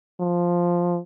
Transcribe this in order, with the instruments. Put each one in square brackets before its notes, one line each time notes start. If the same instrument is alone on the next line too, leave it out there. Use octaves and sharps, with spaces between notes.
[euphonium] F3